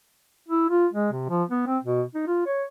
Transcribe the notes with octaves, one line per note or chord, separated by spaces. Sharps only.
E4
F4
G#3
C3
F3
B3
C4
B2
D#4
F4
C#5